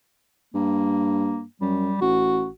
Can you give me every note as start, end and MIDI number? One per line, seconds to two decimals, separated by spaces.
0.54 1.42 43
0.54 1.44 58
1.61 1.92 42
1.61 1.99 55
2.01 2.47 33
2.01 2.49 66